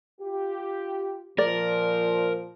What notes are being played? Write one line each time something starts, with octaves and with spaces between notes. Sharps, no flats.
F4 G4
A#2 F3 A#4 D5